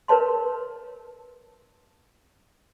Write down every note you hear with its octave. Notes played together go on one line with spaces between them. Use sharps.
A#4 B4 C#5 A5 C6